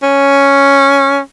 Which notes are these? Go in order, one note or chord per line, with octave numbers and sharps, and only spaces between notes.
C#4